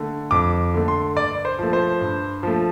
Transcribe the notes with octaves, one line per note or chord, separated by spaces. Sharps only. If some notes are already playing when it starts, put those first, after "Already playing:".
Already playing: D3 A3
F2 D6
D3 A3
C6
G2 D5
C5
F3 A3
C5
G2
F3 A3